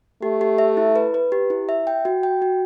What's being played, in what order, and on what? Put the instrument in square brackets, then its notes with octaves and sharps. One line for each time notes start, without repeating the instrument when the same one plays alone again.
[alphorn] A3 [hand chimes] G4
[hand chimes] G4
E5
E4
B4
B4
G4
E4
E5
G5
F#4
G5
F#4